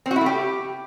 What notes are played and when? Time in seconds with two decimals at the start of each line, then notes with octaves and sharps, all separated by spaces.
0.06 C4
0.11 F#4
0.16 E4
0.21 A3
0.26 G4